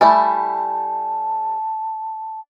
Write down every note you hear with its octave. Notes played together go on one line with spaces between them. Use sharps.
G3 A3 E4 G#5 A5